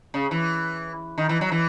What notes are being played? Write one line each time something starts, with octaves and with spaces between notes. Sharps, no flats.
C#3
E3
D#3
E3
F#3
E3